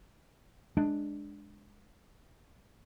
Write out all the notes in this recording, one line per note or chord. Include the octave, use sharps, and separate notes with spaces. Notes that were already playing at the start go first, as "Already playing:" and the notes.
G#3 D4